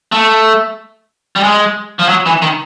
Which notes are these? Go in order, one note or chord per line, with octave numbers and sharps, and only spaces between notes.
A3
G3
G#3
F3
F#3
E3
D#3